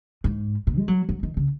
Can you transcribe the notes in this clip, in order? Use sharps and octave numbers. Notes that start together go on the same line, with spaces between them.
G#2
A#2
G#3
F#3
F#3
D#3
C#3